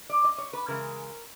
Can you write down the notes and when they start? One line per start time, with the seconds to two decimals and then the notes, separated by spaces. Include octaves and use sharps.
0.10 D5
0.24 D#5
0.38 C#5
0.53 B4
0.68 C#3 E3 G#3 A#4